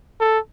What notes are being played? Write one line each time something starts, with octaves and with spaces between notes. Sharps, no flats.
A4